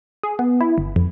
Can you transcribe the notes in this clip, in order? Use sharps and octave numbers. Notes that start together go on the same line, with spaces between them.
G#4
B3
E4
G1
F2